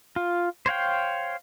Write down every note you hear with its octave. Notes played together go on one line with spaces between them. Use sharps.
F4
C5 C#5 F5 G5